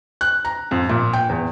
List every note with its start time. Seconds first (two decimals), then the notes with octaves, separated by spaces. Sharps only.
0.21 F#6
0.45 A#5
0.71 F2
0.89 A#2
1.13 G5
1.29 E2